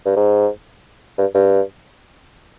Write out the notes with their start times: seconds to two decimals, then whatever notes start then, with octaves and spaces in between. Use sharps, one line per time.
0.05 G2
0.16 G#2
1.18 G2
1.35 G2